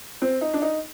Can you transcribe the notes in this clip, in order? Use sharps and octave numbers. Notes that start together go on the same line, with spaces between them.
C4
D#4
D4
D#4